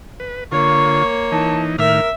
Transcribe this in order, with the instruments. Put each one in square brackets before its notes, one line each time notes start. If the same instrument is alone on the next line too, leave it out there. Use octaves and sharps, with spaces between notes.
[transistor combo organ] B4
[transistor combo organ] D3 F4 [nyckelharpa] A#3 C#5 [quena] C#6
[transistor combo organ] E3 D#4 [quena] A5
[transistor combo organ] A2 D#3 F6 [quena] A#4 [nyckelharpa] E5